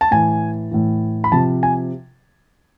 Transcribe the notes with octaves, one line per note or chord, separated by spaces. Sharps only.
A5
A2 E3 G#5
A2 E3
B5
C3 F3 A5
G#5